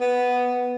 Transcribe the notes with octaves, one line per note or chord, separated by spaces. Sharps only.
B3